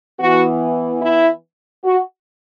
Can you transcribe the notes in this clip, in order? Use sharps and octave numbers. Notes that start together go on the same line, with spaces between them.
E3 B3 F#4
E4
F#4